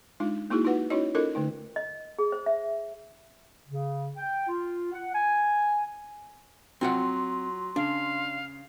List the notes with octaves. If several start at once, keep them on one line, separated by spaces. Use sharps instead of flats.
G#3 D4 D#4 F4
A#3 D#4 E4 F#4 G#4
D#4 F4 F#4 B4 F#5
C#4 D#4 E4 F#4 C#5 D#5
C#4 D#4 F4 A4 A#4 D#5
D3 A3 D#4
D#5
G#4
C5
E5
C#3
G5
F4
F#5
G#5
F#3 C4 F4 F#5 C6
C#3 D4 F5